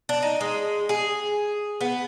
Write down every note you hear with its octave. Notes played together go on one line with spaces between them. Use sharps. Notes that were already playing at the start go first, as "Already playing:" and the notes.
D4
D#4
G#3
G#4
B3